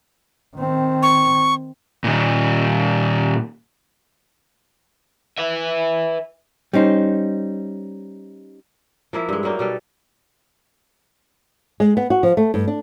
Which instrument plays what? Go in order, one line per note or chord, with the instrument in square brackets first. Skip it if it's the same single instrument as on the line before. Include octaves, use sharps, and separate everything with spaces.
[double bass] D#3 C4
[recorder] C#6
[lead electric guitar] A#2 D#3
[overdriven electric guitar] B4 E5
[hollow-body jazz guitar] G3 C#4 D#4 C5
[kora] F3 A#3 E4
G2 G#3
F#3 G3 A#3 D#4
B2 G3 A4
[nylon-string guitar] G#3
B3
F#4
F3
A3
G2
D4